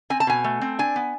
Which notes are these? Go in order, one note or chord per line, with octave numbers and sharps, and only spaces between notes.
C4 G#5
A5
B2 G#5
A3
C4
D4 G#5
B3